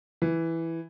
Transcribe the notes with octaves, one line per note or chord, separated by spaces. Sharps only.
E3